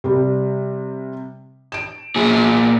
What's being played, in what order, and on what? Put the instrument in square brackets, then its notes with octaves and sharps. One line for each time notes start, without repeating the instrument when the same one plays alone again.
[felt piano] C3 G3
D7 E7
[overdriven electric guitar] A#2 G#4